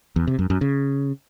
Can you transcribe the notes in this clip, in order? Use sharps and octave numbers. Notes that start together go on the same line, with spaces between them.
E2
C3
F#2
F#2
C#3